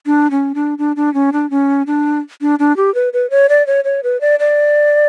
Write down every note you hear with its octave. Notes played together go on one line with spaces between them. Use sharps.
D4
C#4
D4
D4
D4
C#4
D4
C#4
D4
D4
D4
G4
B4
B4
C#5
D5
C#5
C#5
B4
D5
D5